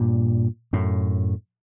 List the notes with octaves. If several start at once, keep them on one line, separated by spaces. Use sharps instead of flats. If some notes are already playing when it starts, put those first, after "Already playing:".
Already playing: G2 A#2
F#2 A2